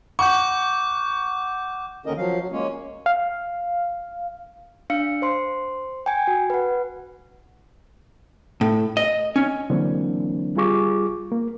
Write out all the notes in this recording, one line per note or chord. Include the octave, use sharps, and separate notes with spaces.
F#5 C#6 D6 G6
D#2 D3 D#3 C#4 A#4 D#5
F3 F#3 F5
F#3
G#3 A#3 C#4 C#5
F5
D4 F5 C#7
C5 C6
G5 G#5
F#4
B4 F#5
A2
D#5
C#4
D3 E3 F#3 A#3 C4 D4
G3 F4 G#4 C#6 D6
A#3